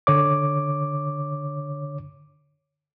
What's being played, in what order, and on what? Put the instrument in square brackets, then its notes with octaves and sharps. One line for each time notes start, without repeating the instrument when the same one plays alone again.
[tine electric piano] D3 C#5 D6